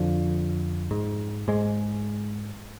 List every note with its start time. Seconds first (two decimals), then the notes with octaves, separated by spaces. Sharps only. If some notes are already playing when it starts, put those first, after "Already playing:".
Already playing: F2 D3 F3
0.91 G#2
1.48 G#2 G#3